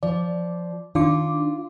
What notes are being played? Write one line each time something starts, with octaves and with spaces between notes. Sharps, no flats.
F3 D5
D#3 D4 F4 D6